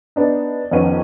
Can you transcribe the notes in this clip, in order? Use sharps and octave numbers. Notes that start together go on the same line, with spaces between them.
B3 D4 D#4
F2 D#3 B3 C#4 F#5 D#7